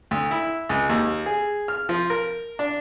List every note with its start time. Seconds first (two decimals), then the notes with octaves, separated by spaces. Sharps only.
0.11 D2
0.31 E4
0.69 C#2
0.90 D#2
1.26 G#4
1.68 F6
1.89 F3
2.10 A#4
2.59 D4